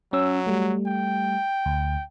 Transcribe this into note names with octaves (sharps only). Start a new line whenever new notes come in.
F#3 C#4 E6
G3 A3
G5
D2